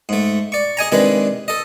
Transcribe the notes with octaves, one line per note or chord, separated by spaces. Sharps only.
G#2 A3
D5 C#6
G#4 D#5 G#5 A#5
C3 D#3 G#3 D4 B4
A4 D#5